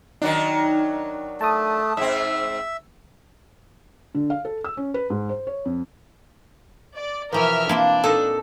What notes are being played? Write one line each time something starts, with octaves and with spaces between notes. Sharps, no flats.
D#3 F#3 D4 D#4
A3 A5 D#6
G#2 C4 E5 E6
D3
F5
A4
E6
C#4
B4
G#2
C5
C#5
F2
D5
B2 E3 F3 A#4 E5 F6
A#3 C4 D4 E4 F4
A#2 D#4 A4 A5